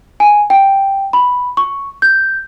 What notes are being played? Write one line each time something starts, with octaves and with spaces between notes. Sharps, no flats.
G#5
G5
B5
C#6
G6